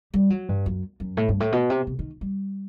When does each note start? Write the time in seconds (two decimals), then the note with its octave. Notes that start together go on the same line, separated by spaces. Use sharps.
0.14 G3
0.30 F#3
0.49 G2
0.66 F#2
1.00 F#2
1.17 A2
1.29 G2
1.40 A2
1.52 B2
1.70 C3
1.87 C3
1.99 D#3
2.21 G3